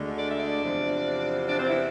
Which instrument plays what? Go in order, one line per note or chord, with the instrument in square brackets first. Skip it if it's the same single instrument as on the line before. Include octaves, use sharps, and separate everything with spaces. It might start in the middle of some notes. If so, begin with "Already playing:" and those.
Already playing: [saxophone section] D2 D3 G#3
D5
E5
D4 D5
E2 C3 F3
D4 D5
C4 C5
E3 E4